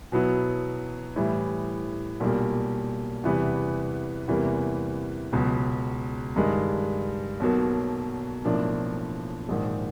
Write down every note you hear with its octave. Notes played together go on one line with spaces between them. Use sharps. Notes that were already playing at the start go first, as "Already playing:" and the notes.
B2 F#3 B3 E4
A2 E3 G3
B1 A#2 G3 A#3
E2 C3 E3 G3 B3
E2 C3 E3 G3 A#3
C#2 B2 F#3
G2 D#3 G#3
B1 B2 F#3 A#3
B1 A2 F3 A#3 D4
A#1 G#2 D#3